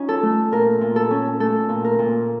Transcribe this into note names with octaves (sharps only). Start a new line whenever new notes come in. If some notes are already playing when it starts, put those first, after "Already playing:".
Already playing: C#4 D#4 F4
A4
A3
A#2 A#4
A#2
A4
C#4
A3 A4
A#2
A#4
A#2